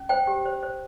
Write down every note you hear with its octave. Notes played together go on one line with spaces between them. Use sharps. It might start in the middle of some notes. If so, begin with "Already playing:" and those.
Already playing: C#4
C5 G5
G4
C5
C5